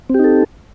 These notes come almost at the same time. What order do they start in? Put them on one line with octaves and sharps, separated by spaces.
C4 G4 D#4 A4